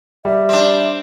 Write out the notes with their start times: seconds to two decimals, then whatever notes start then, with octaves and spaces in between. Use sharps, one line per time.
0.25 G3 E5
0.49 C4 D4